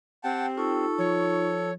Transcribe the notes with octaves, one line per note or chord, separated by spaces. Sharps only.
C4 G4 F#5 G5 A5
D#4 F4 A4 C#6
F3 C#5